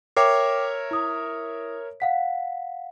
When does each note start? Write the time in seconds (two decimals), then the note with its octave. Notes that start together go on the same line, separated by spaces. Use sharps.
0.17 A#4 C#5 E5 G5 D6 C7
0.91 E4 D#6
2.00 F5 F#5 B6